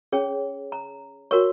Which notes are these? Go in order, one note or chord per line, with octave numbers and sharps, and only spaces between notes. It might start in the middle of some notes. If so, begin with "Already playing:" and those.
C#4 G#4 C#5
A#5
F#4 A#4 C#5 C#6